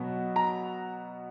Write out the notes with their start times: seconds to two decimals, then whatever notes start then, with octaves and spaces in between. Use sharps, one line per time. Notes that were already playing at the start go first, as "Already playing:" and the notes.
Already playing: B2 F#3 B3
0.36 A#5